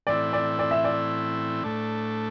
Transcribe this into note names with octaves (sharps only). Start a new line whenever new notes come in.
A2 E3 C4 E4 D5
D5
D5
E5
D5
A2 A3 D4